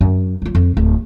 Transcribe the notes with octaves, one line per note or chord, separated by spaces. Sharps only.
F#2
F#3 F4
F2
D1